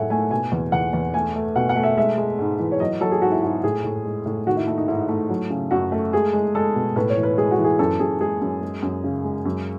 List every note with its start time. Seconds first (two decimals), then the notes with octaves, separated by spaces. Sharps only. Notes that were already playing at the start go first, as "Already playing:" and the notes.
Already playing: A2 F#3 G#3 A3 E5 F#5 G#5
0.10 A3 G#5
0.31 B2 G#5
0.52 E2
0.72 E2 F#5
0.93 E2
1.14 A3 G#5
1.35 A3
1.56 B2 F#5
1.69 F#5
1.76 A3
1.83 E5
1.97 G#3 E5
2.18 G#3
2.39 G#2
2.59 E3
2.72 C#5
2.80 F#3 D#5
3.01 F#3 A4
3.12 G#4
3.21 G#2 F#4
3.32 E4
3.42 G#2 F#4
3.63 A2 G#4
3.84 A2
4.05 G#3
4.26 A2
4.47 D#3 F#4
4.57 E4
4.67 A3 D#4
4.78 D#4
4.88 G#2 E4
5.08 A3
5.29 F#3
5.50 C#3
5.71 F#2 F#4
5.92 A3
6.13 G#3 G#4
6.33 G#3
6.55 G#3 A4
6.75 B2
6.96 A2 B4
7.10 C#5
7.17 E3
7.23 B4
7.37 G#3 G#4
7.51 F#4
7.58 E3
7.64 G#4
7.79 F#2 A4
8.00 F#2 G#4
8.20 G#3 G#4
8.41 F#2
8.62 G#3
8.82 F#2
9.04 C#3
9.25 G#3
9.45 F#2